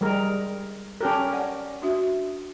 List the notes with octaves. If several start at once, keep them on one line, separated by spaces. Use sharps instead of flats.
G3 G#3 A#4
C#4 G4 A4 A#4 C#5 A5
D5 F#5
D4 F#4 E5